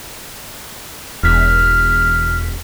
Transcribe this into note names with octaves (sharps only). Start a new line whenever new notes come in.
E1 E2 F6 B6